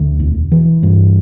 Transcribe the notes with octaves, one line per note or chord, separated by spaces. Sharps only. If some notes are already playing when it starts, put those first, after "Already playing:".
Already playing: D2
E1
E3
G2